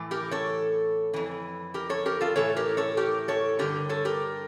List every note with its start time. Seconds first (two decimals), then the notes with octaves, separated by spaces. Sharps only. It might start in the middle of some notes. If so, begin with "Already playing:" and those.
Already playing: A2 E3
0.11 G4 A#4
0.31 A4 C#5
1.14 F2 E3
1.74 G4 A#4
1.89 A4 C#5
2.06 G4 A#4
2.21 F4 A4
2.36 A2 E3 A4 C#5
2.56 G4 A#4
2.77 A4 C#5
2.97 G4 A#4
3.28 A4 C#5
3.59 G2 D3 G4 A#4
3.89 A4 C#5
4.05 G4 A#4